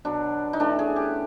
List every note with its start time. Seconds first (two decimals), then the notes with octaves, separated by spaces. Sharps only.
0.05 B2 F#3 B3 D4
0.53 D#4
0.60 E3 A3 C#4 D4
0.79 G#4
0.96 G4